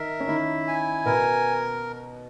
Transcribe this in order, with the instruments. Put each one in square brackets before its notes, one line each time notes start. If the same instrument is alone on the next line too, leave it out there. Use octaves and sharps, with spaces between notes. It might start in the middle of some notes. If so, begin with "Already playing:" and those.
Already playing: [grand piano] D#3 D#4 [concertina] A#4 E5
[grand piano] C#4
[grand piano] D#3 D#4 [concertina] E4
[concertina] G#5
[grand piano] B2 B3 [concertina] A#4